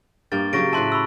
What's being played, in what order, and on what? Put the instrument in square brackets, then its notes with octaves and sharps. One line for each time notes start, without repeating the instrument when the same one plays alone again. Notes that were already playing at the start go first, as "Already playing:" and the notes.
[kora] G2 A#3 G5 [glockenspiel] A6
[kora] C#3 F#3 G4 [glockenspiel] C#6 A#6 D7
[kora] A2 B4 E5 [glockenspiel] A5 C6 F#6
[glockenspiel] B5 C#6 E6